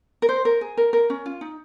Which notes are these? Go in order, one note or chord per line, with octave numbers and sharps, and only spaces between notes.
A#4
C5
A#4
G#4
A#4
A#4
C#4
F4
D#4